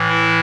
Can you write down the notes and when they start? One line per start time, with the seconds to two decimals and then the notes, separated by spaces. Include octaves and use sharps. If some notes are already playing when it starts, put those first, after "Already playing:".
Already playing: A2 E3
0.08 E4